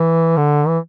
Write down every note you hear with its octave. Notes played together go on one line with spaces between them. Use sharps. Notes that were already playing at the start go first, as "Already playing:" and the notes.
Already playing: E3
D3
E3